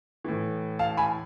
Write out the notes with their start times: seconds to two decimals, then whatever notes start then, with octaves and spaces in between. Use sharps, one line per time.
0.24 A2 E3
0.79 F5 A5
0.97 G#5 B5